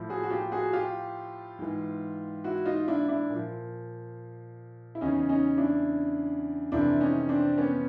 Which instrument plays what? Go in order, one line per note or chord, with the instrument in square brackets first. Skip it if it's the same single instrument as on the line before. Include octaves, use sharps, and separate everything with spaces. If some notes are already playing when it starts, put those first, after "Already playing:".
Already playing: [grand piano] A2 F3
F#4 G#4
F#4
F4 G4
F#4 G#4
F4 G4
G#2 E3
E4 F#4
D#4 F4
D4 E4
D4 E4
A#2
F3
E4
E2 C#3 E3 C#4 D#4
C#4 D#4
D4 E4
F2 C3 E3 D4 E4
C#4 D#4
C4 D4
B3 C#4